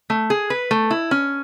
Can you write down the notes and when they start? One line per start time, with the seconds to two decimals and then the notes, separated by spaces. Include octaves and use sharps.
0.10 A3
0.30 G#4
0.50 B4
0.71 A3
0.91 E4
1.11 C#4